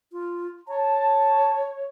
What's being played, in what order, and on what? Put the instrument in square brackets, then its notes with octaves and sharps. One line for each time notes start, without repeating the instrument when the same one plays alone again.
[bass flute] F4
[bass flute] C#5 [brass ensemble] A5